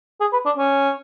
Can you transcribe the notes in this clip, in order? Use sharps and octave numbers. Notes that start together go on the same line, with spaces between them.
G#4
B4
D4
C#4